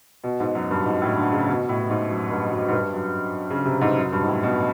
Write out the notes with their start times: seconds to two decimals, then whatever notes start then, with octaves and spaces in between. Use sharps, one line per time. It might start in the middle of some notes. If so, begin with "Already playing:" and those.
0.24 B2
0.40 G#2
0.55 F#2
0.71 G2
0.86 G#2
1.02 A2
1.17 D3
1.33 C#3
1.48 B2
1.69 A2
1.90 G#2
2.10 F#2
2.31 G2
2.52 F#2
2.68 G#2
2.73 G2
2.93 F#2
3.50 C#3
3.65 C3
3.81 G#2
3.97 F#2
4.12 G2
4.23 G#2
4.28 A2
4.43 B2